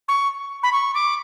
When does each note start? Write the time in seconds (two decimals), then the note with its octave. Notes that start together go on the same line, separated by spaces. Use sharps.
0.08 C#6
0.63 B5
0.72 C#6
0.94 D6